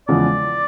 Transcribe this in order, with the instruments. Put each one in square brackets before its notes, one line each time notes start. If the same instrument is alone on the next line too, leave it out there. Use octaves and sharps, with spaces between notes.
[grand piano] E2 C#3 F3 G#3 [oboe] D5